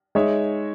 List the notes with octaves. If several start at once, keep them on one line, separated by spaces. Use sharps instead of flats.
G#3 D#4 G#4 C#5 E5